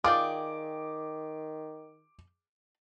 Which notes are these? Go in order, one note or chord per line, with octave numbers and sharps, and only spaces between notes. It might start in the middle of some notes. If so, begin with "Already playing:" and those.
D#3 F4 G#4 D5 G5 D6